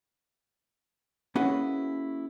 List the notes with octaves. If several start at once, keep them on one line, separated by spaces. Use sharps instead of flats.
A#3 C#4 E4 F#4 G#4 B4